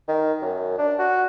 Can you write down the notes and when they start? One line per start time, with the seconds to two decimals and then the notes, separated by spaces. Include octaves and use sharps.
0.08 D#3
0.42 F#2
0.78 D4
0.99 F#4